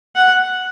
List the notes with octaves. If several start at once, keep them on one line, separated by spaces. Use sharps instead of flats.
F#5